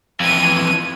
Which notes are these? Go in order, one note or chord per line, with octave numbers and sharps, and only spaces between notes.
F2 E3 G#6 D#7